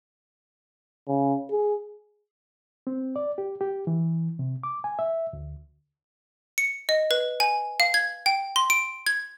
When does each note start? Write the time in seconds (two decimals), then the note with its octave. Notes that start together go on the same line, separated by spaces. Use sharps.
1.08 C#3
1.51 G#4
2.87 C4
3.16 D5
3.38 G4
3.61 G4
3.87 E3
4.39 C3
4.63 D6
4.84 G#5
4.99 E5
5.33 D2
6.58 C#7
6.89 D#5
7.11 B4
7.40 G#5
7.80 F5
7.94 G#6
8.26 G5
8.56 C6
8.70 D7
9.06 G#6